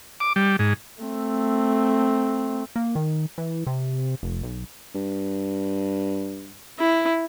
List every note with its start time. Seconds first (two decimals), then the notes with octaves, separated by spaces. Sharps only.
0.20 D6
0.36 G3
0.59 G#2
1.03 A3 C4
2.76 A#3
2.95 D#3
3.38 E3
3.67 C3
4.23 F1
4.43 B1
4.95 G2
6.79 E4